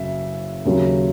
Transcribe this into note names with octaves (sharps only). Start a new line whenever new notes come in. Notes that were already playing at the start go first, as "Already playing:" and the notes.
Already playing: F#1 C#3 F#3 E5
D#2 C#3 F#3